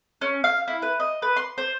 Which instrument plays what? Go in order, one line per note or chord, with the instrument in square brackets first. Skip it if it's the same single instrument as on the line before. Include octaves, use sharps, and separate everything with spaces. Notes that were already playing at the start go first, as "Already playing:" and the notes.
[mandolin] C#4
F5
E4
B4
D#5
B4
C6
C5